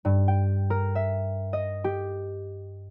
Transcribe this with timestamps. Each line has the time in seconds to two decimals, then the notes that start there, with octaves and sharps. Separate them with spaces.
0.05 G2
0.28 G5
0.70 A#4
0.95 E5
1.53 D#5
1.84 G4